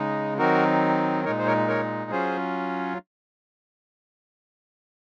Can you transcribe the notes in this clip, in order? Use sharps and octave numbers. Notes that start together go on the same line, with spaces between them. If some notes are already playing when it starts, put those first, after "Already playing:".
Already playing: C#3 G#3 D#4
D#3 F#3 C4 D#4 F#4 A#4
A#2 G#3 D#4 A#4 C#5
C5
A#4 C#5
A#4 C#5
F#3 C#4 F4 G#4 C5